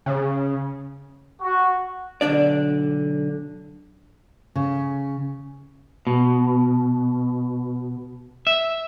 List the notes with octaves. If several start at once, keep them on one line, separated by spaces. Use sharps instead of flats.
C#3
F#4
B1 A#2 D3 D4 D5
C#3
B2
E5